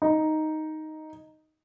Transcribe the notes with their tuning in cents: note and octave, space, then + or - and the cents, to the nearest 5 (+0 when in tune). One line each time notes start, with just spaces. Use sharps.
D#4 +0